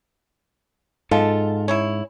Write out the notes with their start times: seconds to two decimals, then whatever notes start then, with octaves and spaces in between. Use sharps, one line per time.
1.11 G#2 F4 A4 D#5 A5
1.68 C#4 D#4 E4 C#5